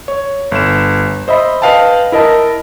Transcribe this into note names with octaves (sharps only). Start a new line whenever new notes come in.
C#5
G1 E7
C5 D#5 E5 B5
B4 D#5 F5 G5 A5
E4 A#4 D#5 A5